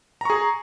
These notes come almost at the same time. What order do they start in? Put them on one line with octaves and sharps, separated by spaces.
A#5 C#6 G#4